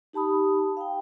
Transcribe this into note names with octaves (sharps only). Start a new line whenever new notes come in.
D#4 G4 A5 B5 D#6
F5 G5